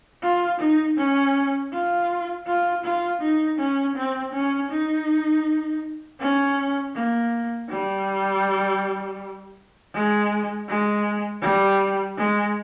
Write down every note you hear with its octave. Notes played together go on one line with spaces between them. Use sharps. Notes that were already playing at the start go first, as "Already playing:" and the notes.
F4
D#4
C#4
F4
F4
F4
D#4
C#4
C4
C#4
D#4
C#4
A#3
G3
G#3
G#3
G3
G#3